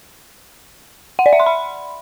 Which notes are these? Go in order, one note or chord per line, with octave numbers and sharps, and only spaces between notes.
F#5
D5
E5
C6
B5